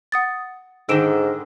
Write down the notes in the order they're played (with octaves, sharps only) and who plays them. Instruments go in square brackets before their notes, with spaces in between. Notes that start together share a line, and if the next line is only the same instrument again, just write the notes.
[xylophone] F#5 D#6 A6
[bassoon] G#2 [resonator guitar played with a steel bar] D3 D#3 [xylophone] E6 D7 E7